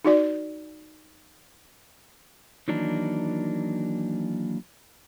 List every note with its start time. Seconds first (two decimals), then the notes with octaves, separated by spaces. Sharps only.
0.05 D#4 F#4 D5
2.68 D#3 E3 F#3 A#3 D4 D#4